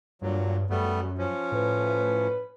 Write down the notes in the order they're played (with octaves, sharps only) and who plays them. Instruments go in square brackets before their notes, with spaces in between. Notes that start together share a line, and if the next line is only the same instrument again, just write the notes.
[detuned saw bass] G2 [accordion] A#2 F#3
[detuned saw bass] F#2 [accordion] G3 A3 B3
[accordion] F3 C#4
[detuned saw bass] A2 [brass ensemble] B4